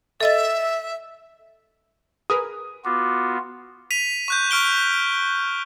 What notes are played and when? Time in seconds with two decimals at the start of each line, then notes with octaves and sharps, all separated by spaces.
0.21 A4 D#5 E5 A6
2.30 G#4 A#4 B4 D#6
2.85 B3 F4 F#4 D6
3.91 B6 D#7 F7
4.28 C#6 F#6 G6
4.51 C#6 F6 D7 G7